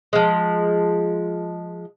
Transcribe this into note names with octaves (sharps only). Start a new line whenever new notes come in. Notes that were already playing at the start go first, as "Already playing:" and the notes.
F3 G#3